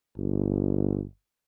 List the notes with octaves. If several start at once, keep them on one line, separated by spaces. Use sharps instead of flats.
G1